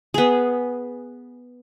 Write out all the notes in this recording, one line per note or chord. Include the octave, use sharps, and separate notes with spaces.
B3 G#4